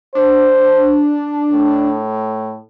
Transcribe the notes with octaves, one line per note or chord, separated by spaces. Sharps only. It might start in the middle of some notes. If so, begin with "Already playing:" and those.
D4 C5
A2